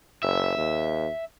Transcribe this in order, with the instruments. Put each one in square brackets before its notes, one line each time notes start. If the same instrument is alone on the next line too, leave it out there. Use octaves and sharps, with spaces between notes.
[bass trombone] F#1 [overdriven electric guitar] E5
[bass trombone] D#2